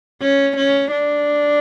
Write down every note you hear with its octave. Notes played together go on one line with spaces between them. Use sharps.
C#4
C#4
D4